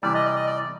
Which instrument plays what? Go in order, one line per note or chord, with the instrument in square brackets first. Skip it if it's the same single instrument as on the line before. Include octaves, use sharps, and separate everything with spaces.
[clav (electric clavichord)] C3 E3 G3 [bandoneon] D5
[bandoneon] D#5
D5
D#5
D5